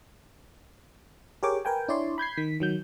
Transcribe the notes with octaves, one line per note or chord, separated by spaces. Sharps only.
G4 G#4 A#4 C#5 G5 D6
A#4 B4 G5 G#5
D4 E4 C#5 D5 C6
B5 G6 G#6 C7
D#3 B6
D#3 F#3 G6